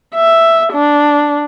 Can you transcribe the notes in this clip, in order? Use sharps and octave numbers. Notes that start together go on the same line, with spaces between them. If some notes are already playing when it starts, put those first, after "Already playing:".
E5
D4